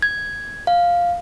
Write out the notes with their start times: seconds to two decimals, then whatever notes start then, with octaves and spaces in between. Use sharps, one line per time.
0.02 G#6
0.67 F5